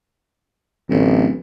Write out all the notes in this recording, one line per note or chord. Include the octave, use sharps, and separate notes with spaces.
D1 A1